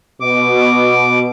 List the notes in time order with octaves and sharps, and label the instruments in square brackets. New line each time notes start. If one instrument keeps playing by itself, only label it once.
[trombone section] B2 [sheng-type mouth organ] D6